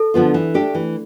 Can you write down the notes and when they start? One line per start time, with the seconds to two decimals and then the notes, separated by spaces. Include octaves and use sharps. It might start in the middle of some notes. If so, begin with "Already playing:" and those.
Already playing: A4
0.14 D3 F3 B3 F4
0.34 E3
0.54 A3 D4 G4
0.75 E3